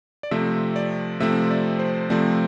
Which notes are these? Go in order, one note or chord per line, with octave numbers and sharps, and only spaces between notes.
D5
C3 F3 A3 C4 E5
D5
C3 F3 A3 C4 E5
D5
C5
C3 F3 A3 C4 D5